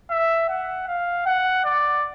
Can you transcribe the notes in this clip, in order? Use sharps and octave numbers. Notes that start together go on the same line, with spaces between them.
E5
F#5
F5
F#5
D5